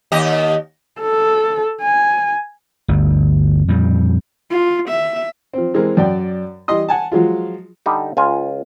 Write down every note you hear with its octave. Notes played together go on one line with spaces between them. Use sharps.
D#2 G4 D#5
A4
G#5
G1 D2
F2 A#2 G3
F4
E5
F3 C4
E3 G#3 C4 A#4
F#2 D5 G5
E3 G3 D#5 C6 D#6
F#5 G#5 A5
F3 F#3 G#3 F4
D3 G3 D#4
C#2 F4 G#5